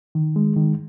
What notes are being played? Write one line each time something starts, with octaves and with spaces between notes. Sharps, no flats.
D#3
G#3
D#3